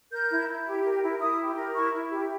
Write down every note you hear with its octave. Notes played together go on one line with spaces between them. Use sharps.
A#4 G6
E4
E4
G4
A#4
E4
E4 D#6
G4
A#4
E4 C#6
E4
G4